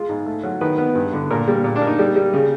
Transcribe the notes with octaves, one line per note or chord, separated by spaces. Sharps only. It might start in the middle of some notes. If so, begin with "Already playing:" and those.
Already playing: G#3 F4
G#2
A3
F#3
D#3 B4
B3 B4
G2
D3
A#2 A#4
G3
A#2
D4
A#3
D#4
G3
G3
C#3